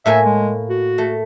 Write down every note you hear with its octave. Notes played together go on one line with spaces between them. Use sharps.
A2 A#3 E5 G#5
G#3
F#4
A3